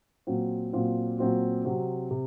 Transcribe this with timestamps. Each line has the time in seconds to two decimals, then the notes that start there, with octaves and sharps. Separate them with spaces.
0.27 A#2 F#3 C4 F4
0.73 A#2 F#3 C4 F4
1.19 A#2 F#3 C4 F4
1.65 C3 F#3 C4
2.11 C3